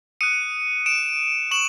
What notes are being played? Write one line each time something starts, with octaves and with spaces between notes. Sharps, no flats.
D#6 F#6 C#7 D#7
D7 E7
C#6 E7 F#7